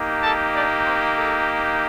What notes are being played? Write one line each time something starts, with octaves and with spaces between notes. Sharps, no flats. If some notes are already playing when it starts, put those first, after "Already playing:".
Already playing: A#3 D#4 G4
A4 A5
D4 D5
C4 C5
A4